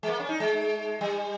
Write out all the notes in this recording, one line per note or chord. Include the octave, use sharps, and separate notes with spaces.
G#3
A#3
C#4
D#4
G#3
G3